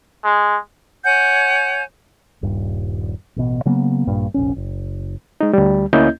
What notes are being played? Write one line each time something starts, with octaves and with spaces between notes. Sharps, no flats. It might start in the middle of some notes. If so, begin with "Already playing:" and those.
G#3
C#5 F#5 G#5 G6
D#1 G2
A1 B2
C#3 F#3 A#3 B3
A#1 G2 A#2
F1 A#1 C#4
F#1
G#3 D#4
D2 G3
D2 A#3 C#4 E4 D#5 G6